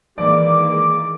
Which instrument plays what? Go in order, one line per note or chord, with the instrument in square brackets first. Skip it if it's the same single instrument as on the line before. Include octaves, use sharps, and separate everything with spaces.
[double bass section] D#3 E3 A#3 [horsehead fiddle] G#3 [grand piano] D5 [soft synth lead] D6